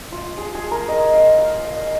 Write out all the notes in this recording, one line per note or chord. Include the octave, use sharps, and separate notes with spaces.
F4
G#4
G#4
A#4
D#5
F5
F5
F5
D#5